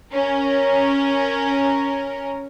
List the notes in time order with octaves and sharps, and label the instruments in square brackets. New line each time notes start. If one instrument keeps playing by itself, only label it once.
[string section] C#4 A#4